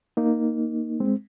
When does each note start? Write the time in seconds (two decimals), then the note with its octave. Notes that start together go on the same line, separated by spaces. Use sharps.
0.17 A#3 D#4
1.00 G#3 C4